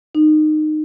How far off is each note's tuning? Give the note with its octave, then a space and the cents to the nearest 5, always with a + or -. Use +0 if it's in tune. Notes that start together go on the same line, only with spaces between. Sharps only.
D#4 -20